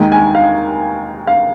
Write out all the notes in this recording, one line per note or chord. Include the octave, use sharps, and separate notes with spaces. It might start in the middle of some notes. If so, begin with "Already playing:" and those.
Already playing: D#2 D#3 G#3
G#5
F5
F5